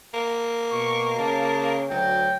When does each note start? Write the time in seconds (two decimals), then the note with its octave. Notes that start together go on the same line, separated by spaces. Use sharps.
0.14 A#3
0.72 B2 C#6
1.19 C#3 A5
1.90 D2 F#3 G5